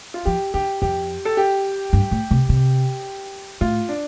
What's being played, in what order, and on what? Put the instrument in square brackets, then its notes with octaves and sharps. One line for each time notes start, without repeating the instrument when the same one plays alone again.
[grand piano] F4
[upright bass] F3 [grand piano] G4
[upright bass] D3 [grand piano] G4
[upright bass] F2 [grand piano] G4
[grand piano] A4
G4
[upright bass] G2
A2
C3
C3
[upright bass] A2 [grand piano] F4
[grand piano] D4